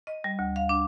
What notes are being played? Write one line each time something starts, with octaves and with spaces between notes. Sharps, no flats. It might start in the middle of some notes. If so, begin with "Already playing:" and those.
D#5
G3
D2
F5
D4